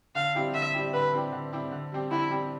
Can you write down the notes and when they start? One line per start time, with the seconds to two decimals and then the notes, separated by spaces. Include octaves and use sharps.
0.15 D3 F5
0.35 G3 C4 E4 G4
0.54 D3 E5
0.74 G3 C4 E4 G4
0.93 D3 B4
1.13 G3 C4 E4 G4
1.32 D3
1.53 G3 C4 E4 G4
1.72 D3
1.92 G3 C4 G4
2.11 D3 E4
2.30 G3 C4 G4